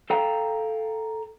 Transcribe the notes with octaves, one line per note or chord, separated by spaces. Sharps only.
A4 F5 G5 A#5